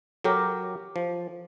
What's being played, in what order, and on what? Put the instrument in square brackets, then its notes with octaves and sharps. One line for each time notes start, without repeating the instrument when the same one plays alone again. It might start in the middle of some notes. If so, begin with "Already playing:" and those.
[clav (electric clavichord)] F#3 G4 A#4 [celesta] A4 C#5 D6
[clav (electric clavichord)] F3